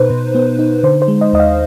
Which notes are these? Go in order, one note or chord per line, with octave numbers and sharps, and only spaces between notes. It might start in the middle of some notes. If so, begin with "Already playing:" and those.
Already playing: B2 D#4 B4 C5
B2
B3
D#4
D3 C5
C5
G#3
D#5
D#2 D#5
F5